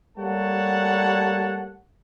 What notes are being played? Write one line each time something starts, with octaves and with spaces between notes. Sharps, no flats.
G3 A3 A#3 C#5 F#5 A5